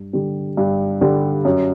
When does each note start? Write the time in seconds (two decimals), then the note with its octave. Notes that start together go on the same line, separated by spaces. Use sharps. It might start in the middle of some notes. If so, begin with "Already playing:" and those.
Already playing: G2
0.13 D3 G3
0.57 G2
1.01 D3 G3
1.45 F#2